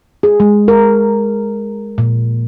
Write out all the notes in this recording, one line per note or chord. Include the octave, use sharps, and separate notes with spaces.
G#4
G#3
A#4
A#2